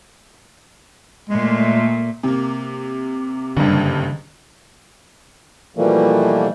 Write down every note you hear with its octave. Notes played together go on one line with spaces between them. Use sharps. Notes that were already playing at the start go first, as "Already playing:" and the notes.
A#2 G#3 A3
C3 A#3
F#1 G2 D3
B2 E3 F3 G3 A3 A#3